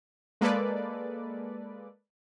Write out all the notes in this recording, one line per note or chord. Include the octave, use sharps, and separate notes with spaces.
G#3 A#3 A4 B4 D5